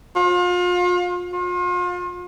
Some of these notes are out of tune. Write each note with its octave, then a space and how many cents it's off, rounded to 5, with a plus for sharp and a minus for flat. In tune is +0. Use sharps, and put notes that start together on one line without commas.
F4 +35
F4 +35